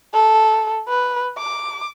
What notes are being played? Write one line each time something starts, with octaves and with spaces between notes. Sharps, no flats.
A4
B4
D6